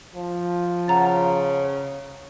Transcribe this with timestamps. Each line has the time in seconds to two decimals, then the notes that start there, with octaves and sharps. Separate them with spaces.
0.15 F3
0.88 C#3 F#5 A#5 A6